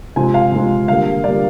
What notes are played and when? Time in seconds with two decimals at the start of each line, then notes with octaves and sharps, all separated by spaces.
0.16 C3 F3 G#3 C4 G#5
0.34 F5
0.52 C3 F3 G#3 C4
0.88 D3 G3 A#3 F5
1.24 D3 G3 A#3 D5